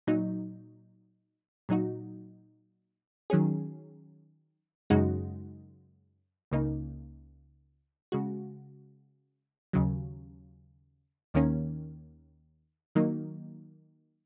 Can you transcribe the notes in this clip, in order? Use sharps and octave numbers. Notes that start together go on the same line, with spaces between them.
A#2 F#3 D#4
A#2 F#3 D#4 F#4
D#3 F#3 C#4 G#4
F#2 C#3 G#3 D#4 F#4
C#2 C#3 A#3 D#4
C#3 G#3 F#4
D#2 C#3 F#3
D#2 D#3 A#3 C#4
D#3 F#3 A#3 D#4